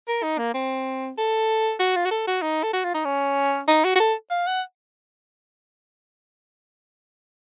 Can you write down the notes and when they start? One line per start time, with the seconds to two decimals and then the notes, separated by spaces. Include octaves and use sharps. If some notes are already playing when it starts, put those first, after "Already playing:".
0.08 A#4
0.23 D#4
0.38 A#3
0.54 C4
1.18 A4
1.80 F#4
1.96 F4
2.05 F#4
2.11 A4
2.28 F#4
2.42 D#4
2.63 A4
2.73 F#4
2.84 F4
2.95 D#4
3.05 C#4
3.68 D#4
3.85 F#4
3.96 F#4
4.00 A4
4.31 F5
4.47 F#5